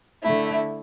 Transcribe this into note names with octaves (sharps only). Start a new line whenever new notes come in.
D3 A3 E4